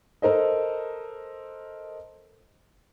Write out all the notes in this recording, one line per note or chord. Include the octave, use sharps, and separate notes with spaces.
A4 A#4 C5 D#5